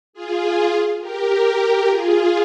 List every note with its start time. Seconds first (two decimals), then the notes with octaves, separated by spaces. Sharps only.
0.13 F4 G#4
1.01 G4 A#4
1.88 F4 G#4